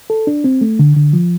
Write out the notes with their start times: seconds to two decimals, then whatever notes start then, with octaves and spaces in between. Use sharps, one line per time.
0.10 A4
0.27 D4
0.44 C4
0.61 A3
0.79 D3
0.96 D3
1.13 F3